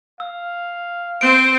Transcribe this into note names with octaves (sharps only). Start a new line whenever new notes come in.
F5 E6
C4 C5 D7